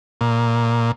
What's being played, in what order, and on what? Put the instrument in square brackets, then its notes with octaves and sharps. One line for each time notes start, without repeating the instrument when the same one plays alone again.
[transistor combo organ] A#2